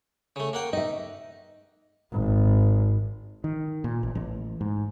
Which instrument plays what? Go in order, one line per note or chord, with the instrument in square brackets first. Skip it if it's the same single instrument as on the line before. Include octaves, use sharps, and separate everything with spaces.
[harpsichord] C#3 A3
A#3 F#5 G5
[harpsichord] D#4 [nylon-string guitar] D#5 E5
[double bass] G#1
[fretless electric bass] D#3
A#2
A1
A1
G#2